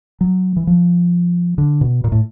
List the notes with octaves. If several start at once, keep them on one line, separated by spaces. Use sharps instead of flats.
F#3
E3
F3
D3
B2
A#2
A2